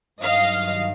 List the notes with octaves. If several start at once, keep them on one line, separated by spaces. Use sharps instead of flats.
G2 D#3 F#3 D#5 F5